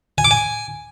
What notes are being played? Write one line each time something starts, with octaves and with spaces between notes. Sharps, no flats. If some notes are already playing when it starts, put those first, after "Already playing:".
G#5
D6
G#5